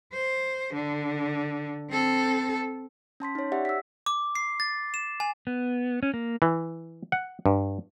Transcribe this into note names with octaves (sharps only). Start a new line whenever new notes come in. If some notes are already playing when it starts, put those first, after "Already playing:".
C5
D3
C4 A4
C#4 A5 C6 B6
D#4 C#5
G4 D5 E5 F#5
E6 B6
D6
C7
A6
E7
G#5
B3
C#4
A#3
E3
F#5
G2